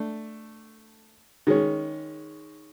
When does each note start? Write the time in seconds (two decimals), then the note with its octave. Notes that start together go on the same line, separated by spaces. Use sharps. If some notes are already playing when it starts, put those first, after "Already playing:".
Already playing: A3 D4
1.47 D#3 G#3 C#4